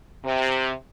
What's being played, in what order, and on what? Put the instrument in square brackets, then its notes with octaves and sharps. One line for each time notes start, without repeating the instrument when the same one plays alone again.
[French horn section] C3